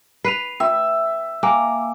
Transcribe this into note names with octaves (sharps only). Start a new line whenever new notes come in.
B4 C7 D#7 F7
E5 G5
A#3 G5 G#5 D6